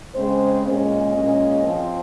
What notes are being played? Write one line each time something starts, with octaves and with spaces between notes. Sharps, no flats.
C#3 G#3 C4 C5
A#2 G#3 C#4 D#5
A#2 G#3 C#4
F3 C4